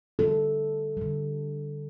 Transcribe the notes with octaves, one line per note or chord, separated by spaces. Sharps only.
D3 G3 A4
D3 G3